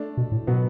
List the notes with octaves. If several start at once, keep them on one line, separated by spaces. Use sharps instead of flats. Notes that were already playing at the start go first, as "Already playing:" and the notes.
Already playing: A3 D4
B2
A2
B2 F#3 B3